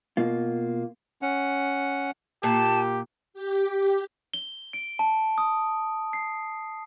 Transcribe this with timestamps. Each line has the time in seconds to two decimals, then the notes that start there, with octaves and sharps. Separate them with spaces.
0.17 B2 A#3 F4
1.22 C#4 F#5
2.43 A#2 G4 A5
3.34 G4
4.34 G7
4.73 D7
4.99 A5
5.38 D#6
6.13 C7